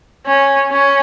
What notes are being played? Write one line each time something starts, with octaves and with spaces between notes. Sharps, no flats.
C#4
C#4